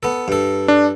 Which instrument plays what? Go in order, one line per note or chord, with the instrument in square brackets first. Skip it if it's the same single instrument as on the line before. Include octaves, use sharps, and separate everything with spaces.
[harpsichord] B3 A4
G2 A4
[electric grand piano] D4